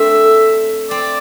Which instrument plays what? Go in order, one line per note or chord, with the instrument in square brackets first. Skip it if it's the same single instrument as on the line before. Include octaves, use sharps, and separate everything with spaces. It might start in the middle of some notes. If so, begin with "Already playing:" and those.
Already playing: [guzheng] A3 C4 D4 [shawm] E5
[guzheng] C4 [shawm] D5